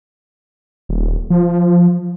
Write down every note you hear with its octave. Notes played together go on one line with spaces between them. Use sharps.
D#1
F3